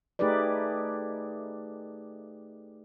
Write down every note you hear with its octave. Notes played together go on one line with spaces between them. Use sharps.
A3 D#4 G4 G#4 B4 D5